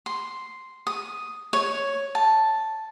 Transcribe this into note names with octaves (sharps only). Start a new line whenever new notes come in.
C6
D#6
C#5
A5